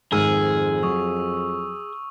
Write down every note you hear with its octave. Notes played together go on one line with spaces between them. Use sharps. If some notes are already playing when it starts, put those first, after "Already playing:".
F2 G#2 D#3 G#4 E6 F6
F#3 C#6 D#6